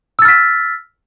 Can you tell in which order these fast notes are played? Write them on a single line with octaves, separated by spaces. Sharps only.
E6 A6 F6 B6